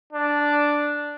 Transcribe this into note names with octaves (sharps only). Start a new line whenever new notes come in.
D4